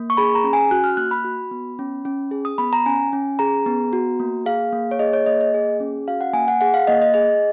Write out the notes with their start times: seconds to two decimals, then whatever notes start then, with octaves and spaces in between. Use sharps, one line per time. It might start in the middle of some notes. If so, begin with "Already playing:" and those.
Already playing: A#3
0.10 C#6
0.17 G#4 B5
0.35 A#5
0.44 C#4
0.53 G#5
0.71 F#4 F#6
0.84 F6
0.97 A#3 F#6
1.11 B5
1.25 F#4
1.51 B3
1.79 C#4
2.05 C#4
2.31 G#4
2.45 D#6
2.58 B3 B5
2.73 A#5
2.86 C#4 G#5
3.13 C#4
3.39 G#4 A#5
3.66 B3
3.93 F#4
4.19 A#3
4.46 G#4 F5
4.73 A#3
4.91 C#5
4.99 G#4 D#5
5.13 C#5
5.26 A#3 D#5
5.41 D#5
5.54 G#4
5.80 C#4
6.08 F#4 F5
6.21 F#5
6.33 A#3 G#5
6.48 F#5
6.61 G#4 F#5
6.74 F5
6.87 A#3 D#5
7.02 D#5
7.14 G#4 D#5